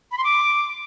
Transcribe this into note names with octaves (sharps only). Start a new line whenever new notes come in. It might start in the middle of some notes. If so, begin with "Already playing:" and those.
B5
C6
D6